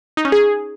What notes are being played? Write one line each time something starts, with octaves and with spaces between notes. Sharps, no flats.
D#4
C#4
G#4